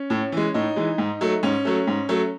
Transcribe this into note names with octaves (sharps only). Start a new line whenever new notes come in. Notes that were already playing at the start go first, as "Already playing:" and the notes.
Already playing: C#4
A2
E3 G#3
A2 D#4
E3 G#3
G#2
F#3 A3
G#2 C#4
F#3 A3
G#2
F#3 A3